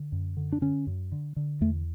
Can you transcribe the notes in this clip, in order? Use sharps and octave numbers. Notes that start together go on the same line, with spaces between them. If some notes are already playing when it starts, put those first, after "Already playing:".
Already playing: D3
F#2
D3
D4
D3 C#4
F#2
D3
D3
E2 A3